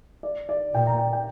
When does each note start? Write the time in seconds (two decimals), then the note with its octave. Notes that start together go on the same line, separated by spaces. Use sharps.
0.23 D5
0.49 D5
0.74 A#2 G5
0.87 A#5
0.99 G5
1.13 G5